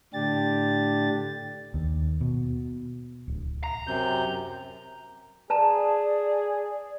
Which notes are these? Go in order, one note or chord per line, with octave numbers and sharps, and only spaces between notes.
A2 D3 D4 G4 A6
D#2
B2
D1
A#5
F#2 C3 G6
G#4 B4 D5 A5 A#5